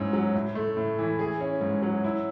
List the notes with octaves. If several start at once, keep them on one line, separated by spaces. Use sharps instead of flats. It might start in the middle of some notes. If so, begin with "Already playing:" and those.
Already playing: G#2 C#4 E4
F#3
A2
A3
A2
E3
G#4
C#4
G#2
F#3
E4